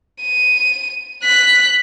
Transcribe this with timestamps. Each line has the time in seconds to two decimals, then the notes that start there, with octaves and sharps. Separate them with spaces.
0.23 D#7
1.24 F#6 B6